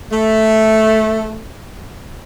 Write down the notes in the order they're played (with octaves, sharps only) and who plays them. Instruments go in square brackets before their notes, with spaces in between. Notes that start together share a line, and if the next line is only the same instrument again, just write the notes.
[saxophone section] A3